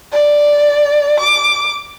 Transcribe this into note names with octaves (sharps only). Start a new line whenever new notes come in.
D5
D6